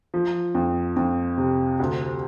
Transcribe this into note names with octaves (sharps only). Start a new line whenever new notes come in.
F3
F2
F2
C3
D2